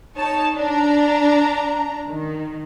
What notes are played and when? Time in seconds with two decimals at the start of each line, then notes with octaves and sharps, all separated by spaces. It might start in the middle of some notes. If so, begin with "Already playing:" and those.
0.17 D#4 C#5 A5
0.56 D4 A#5
2.08 D#3